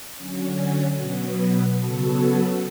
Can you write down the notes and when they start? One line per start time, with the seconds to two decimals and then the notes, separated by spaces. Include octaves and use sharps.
0.16 D3 F#3 C#4
0.97 B2 F#3 B3
1.77 C#3 F#3 B3 F#4 A4